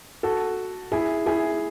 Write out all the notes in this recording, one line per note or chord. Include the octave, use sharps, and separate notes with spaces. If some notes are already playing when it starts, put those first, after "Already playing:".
F#4 A4
E4 G#4
E4 G#4